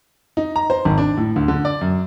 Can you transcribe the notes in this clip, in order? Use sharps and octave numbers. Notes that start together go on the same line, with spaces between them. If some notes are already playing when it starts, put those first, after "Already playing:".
D#4
A#5
C5
G#1
D4
A2
D2
D3
D5
F#2